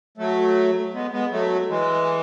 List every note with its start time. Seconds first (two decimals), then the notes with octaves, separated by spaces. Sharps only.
0.18 F#3 A3
0.93 G#3 B3
1.12 G#3 B3
1.31 F#3 A3
1.69 E3 G#3